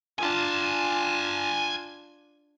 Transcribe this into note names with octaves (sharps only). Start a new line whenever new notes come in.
D4 F4 G#5 A5